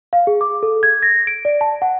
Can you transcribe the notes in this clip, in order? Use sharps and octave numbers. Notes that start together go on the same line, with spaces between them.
F5
G#4
D6
A4
G#6
A#6
D7
D5
A5
F#5